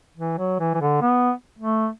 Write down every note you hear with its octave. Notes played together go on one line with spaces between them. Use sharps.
E3
F#3
E3
E3
D3
B3
A3